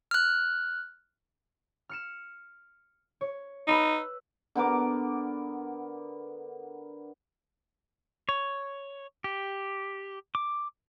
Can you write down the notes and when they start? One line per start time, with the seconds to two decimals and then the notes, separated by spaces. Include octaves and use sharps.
0.11 F6 F#6
1.89 F6 C#7 E7
3.21 C#5
3.68 D#4 B4 B5 E6
4.55 D3 B3 A#4 D6
8.29 C#5
9.24 G4
10.35 D6